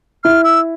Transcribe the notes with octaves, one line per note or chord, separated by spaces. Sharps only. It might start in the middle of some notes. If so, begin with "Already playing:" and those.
E4 F6
E6